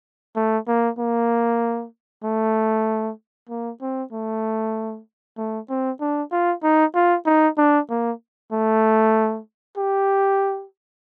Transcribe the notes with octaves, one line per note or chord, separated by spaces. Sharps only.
A3
A#3
A#3
A3
A#3
C4
A3
A3
C4
D4
F4
D#4
F4
D#4
D4
A#3
A3
G4